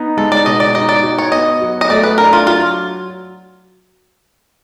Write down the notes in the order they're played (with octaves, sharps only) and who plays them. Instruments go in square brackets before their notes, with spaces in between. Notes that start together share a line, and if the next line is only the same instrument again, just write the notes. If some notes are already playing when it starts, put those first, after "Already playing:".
Already playing: [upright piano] B3 D#4
[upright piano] G#3 [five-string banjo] A4
[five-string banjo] D5
[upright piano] B2 [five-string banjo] D#5
[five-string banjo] D5
[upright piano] D#4 [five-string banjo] D#5
[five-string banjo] D5
[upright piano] F#4
[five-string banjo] C#5
[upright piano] B3 [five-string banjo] D#5
[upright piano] F#3
[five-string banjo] D#5
[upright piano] A3 [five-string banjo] D5
[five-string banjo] B4
[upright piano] D4 [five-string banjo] A#4
[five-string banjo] F4
[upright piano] F#3 [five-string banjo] F4